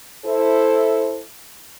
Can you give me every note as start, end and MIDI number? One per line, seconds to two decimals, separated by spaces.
0.25 1.22 64
0.25 1.22 69
0.25 1.22 72